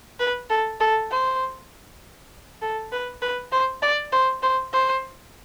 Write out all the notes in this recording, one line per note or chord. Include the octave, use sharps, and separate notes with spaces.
B4
A4
A4
C5
A4
B4
B4
C5
D5
C5
C5
C5